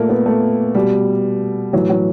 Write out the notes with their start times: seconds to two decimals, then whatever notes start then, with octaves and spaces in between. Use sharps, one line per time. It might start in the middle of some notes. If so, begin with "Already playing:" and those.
Already playing: A#2 A3 A#3
0.09 B3
0.26 A3
0.75 B2 G3
1.73 A2 E3 F#3
1.90 F#3